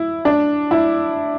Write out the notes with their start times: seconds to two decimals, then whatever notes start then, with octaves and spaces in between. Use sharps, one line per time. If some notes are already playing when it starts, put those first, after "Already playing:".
Already playing: E4
0.25 D4
0.71 E4